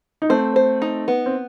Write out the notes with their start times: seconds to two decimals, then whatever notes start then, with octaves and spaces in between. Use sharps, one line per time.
0.22 D#4
0.29 A3 C4 C5
0.56 C5
0.82 D#4
1.08 B3
1.26 C4